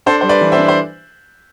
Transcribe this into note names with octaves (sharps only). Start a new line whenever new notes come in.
D4 A4 C5
G3 C5
B4 D5
E3
C5 E5
D4
C5